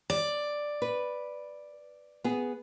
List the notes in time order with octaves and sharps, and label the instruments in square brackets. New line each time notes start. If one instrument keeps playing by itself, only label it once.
[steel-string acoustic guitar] D5
[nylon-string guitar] B4
B3 G#4